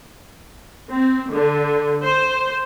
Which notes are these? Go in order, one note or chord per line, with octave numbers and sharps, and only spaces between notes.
C4
D3
C5